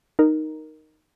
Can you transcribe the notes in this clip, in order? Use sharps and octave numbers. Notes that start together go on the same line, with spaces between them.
D#4 A#4